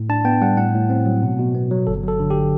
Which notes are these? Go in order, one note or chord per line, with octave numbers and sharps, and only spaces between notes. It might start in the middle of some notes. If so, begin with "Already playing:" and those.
Already playing: A2
D4 A5
B3 G5
G3 F#5
A2 F#5
A2
C4
F#3
B2
B2
B3
F#3
G1 A4
F#3 A4
D3
G4